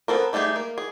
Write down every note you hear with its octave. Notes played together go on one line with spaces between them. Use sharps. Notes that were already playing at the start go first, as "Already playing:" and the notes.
B3 C4 A4 A#4
G3 A3 D#4 G4 G#4
A#3
G#4